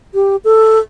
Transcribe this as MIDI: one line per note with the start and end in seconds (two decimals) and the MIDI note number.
0.14 0.36 67
0.44 0.79 69